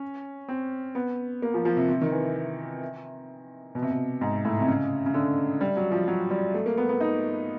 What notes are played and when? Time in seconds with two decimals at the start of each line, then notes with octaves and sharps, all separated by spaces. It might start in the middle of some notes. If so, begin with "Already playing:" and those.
Already playing: C#4
0.49 C4
0.95 B3
1.42 A#3
1.54 F3
1.65 F3
1.77 C3
1.89 C3
2.01 D#3
2.12 E3
3.75 B2
3.82 C3
3.91 B2
4.21 G#2
4.45 A2
4.60 C3
4.68 C#3
5.06 C#3
5.14 D3
5.61 G3
5.77 F#3
5.92 F3
6.08 F#3
6.31 G3
6.54 A3
6.66 A#3
6.77 B3
6.89 B3
7.01 D#4